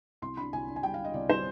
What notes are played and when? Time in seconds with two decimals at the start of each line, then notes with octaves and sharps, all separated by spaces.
0.22 C2 C6
0.37 D4 B5
0.53 C2 G#5
0.68 D4
0.76 G#5
0.83 G3 G5
0.94 D4 F5
1.04 D#5
1.14 C2 D5
1.29 G3 C5